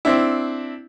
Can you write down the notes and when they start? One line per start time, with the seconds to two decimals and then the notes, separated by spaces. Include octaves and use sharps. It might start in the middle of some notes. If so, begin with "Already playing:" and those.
0.05 C4 D4 E4